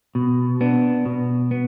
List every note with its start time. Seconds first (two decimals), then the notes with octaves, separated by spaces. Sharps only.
0.15 B2
0.61 B3 D4
1.06 B2
1.51 B3